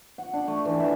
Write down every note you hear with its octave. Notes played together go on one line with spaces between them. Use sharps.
F#5
D4
A3
E3
E5